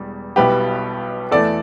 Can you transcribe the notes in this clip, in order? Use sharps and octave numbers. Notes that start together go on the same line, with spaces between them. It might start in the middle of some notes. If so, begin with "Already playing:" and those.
Already playing: E1 E2 G3
B1 B2 G3 E4 G4 B4
E2 E3 A3 A4 D5